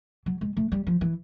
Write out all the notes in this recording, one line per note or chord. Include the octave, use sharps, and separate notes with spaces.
F#3
G#3
A3
G3
F3
E3